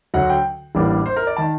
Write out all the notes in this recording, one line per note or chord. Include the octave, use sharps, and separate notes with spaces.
D2 D3 F#3 F#5
G5
A1 A2 G3 A#3 D4
C5
A#4
D5
D#3 A5